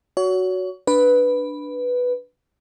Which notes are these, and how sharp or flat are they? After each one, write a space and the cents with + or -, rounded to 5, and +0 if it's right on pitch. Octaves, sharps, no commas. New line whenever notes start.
F#4 +0 C#5 +30
D4 +0 B4 +0